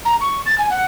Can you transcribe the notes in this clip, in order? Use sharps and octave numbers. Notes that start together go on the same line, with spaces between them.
A#5
C#6
A6
G#5
F#5